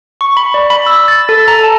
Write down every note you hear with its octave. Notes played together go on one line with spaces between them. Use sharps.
C#6
B5
D5
B5
E6
A6
A4
A#5
A5